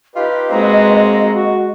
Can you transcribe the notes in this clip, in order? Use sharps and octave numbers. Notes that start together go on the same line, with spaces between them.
D#4 F4 G4 B4 D#5
G#3 A#3 C4 F#4 B4 A#5
F#4